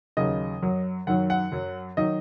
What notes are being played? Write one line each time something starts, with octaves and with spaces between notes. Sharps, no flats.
D#2 C#3 F#3 D#5
F#2 F#3
F#2 D#3 F#3 F#5
F#5
F#2 F#3
D#3 F#3 D#5